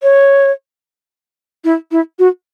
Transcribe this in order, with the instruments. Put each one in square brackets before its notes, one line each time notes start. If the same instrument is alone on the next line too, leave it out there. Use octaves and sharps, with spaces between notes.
[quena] C#5
E4
E4
F#4